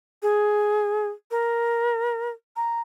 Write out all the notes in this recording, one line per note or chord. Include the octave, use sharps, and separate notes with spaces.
G#4
A#4
A#5